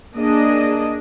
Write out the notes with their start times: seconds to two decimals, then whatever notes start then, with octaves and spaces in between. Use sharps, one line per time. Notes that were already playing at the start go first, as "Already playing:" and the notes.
0.16 A#3 D4 G#4 D#5